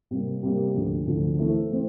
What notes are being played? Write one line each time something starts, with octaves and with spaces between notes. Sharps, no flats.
C3 G3 A#3
C3 G3 A#3
D2 D3 F3
D2 D3 F3
E3 A3 C4 E4 A4
E3 A3 C4